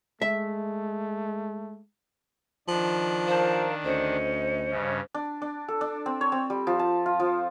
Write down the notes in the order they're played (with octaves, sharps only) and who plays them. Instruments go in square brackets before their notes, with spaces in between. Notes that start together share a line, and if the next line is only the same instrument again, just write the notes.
[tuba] G#3 [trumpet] A3 [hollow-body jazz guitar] E5
[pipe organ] D#3 D4 [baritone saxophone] F3
[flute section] A#4 F5 A5 [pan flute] C5
[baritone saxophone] D2 [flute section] C#4 D#5 [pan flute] C5
[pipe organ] G2 C#3
[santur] D4
D4
A4
D4
C4
C#5
C4
G3
F3
A5
F4
F3